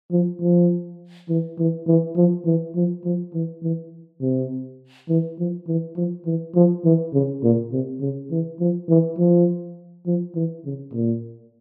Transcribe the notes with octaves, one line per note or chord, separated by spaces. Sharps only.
F3
F3
E3
E3
E3
F3
E3
F3
F3
E3
E3
C3
E3
F3
E3
F3
E3
F3
E3
C#3
A#2
C3
C#3
E3
F3
E3
F3
F3
E3
C#3
A#2